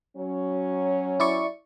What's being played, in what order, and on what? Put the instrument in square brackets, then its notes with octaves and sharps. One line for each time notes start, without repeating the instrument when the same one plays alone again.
[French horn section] F#3 C#4
[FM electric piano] E4 D5 C#6